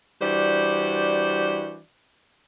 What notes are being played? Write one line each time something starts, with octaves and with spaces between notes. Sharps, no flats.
E3 G3 D4 F#4 C5 D5